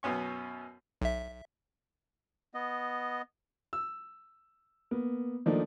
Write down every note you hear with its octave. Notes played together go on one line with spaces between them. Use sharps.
F#2 B2 B3 C#4 C#6
B1 E5
B3 D#5
E6
A#3 B3
D#3 F3 A3 A#3 D4 D#4